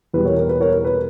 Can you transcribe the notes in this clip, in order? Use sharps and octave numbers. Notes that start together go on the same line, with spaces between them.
E2 B2 G3 B4
A#4 C#5
A#4
B4
A#4 C#5
A#4
B4